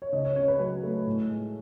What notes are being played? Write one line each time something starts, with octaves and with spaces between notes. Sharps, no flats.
C#5
C#2 D#5
C#5
C#3 C#5
B4
F#3 B4
A3
A2
G#3